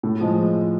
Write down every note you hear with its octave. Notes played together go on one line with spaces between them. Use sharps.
A2
F3 G#3